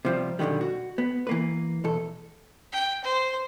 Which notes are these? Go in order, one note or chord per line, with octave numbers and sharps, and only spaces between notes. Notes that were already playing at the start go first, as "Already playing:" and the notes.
C3 F3 G3
B1 F#2 D3 D#3 G3
F#4
B3
E3 A#3 B4
B1 E2 A4
G5
C5